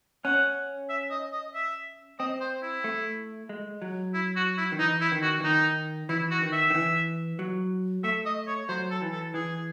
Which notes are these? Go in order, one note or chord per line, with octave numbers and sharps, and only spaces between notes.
C#4 F#5
E5
D#5
D#5
E5
C4 D#5
C5
E4
A3
G#3
F#3
E4
F#4
E4
D#3
E3 D#4
E4
D#3
F#4
E3
D#3 D#4
E3 E4
F#4
D#3
E5
D#3
E3
F#3
A3 E5
D#5
C#5
F#3 C5
A4
E3
A4
E3 G#4